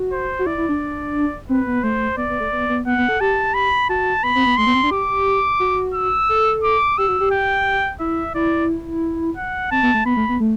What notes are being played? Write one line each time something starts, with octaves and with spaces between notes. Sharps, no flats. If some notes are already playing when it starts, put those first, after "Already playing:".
Already playing: F#4
C5
F#4
E4 D5
E4
D4
C4 B4
B3
A3 C5
B3 D5
B3
A3
B3
B3
B3 F#5
B3
A4
G4 A5
B5
F#4 A5
B3 B5
C4
B3
A3 C6
B3
C4
D4
G4 D6
F#4
E6
A4
D6
G4 E6
F#4
G4
G5
E4 E5
E4 D5
F#5
C4 A5
B3
A3
B3 B5
A3
B3
A3